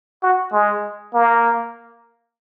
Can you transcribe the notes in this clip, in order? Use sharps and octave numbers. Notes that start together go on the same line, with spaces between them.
F#4
G#3
A#3